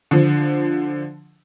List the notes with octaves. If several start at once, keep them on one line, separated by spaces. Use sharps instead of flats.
D3 F3